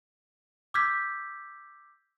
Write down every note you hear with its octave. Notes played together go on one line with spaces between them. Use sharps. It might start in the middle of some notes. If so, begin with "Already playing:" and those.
D6 E6 F6 G6 G#6 B6